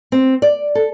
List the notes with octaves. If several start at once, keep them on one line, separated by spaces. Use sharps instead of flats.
C4
D5
A4